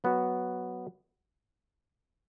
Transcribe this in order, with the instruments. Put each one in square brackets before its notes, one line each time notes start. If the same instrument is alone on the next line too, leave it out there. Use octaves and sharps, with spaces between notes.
[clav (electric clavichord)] F#3 B3 F#4